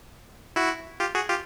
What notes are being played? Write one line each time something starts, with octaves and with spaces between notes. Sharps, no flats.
E4 F#4
F4 G4
F#4 G#4
F4 G4